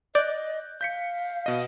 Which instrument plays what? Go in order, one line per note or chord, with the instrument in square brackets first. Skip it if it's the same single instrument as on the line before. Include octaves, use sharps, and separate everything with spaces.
[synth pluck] D5 [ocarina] D#5 [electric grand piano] F#6 G6
[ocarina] F5 [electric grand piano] G6 B6 C#7
[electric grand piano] B2 D#5